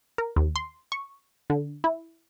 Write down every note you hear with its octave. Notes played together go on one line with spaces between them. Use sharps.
A#4
D#2
C6
C#6
D3
E4